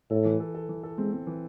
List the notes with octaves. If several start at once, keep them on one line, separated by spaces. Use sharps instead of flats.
A2 A4
E3
A4
A4
E3
A4
G#3 C4
C4
E3